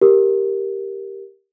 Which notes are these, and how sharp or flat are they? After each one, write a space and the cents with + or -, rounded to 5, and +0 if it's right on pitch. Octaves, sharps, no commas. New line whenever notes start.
G4 +0 A#4 +0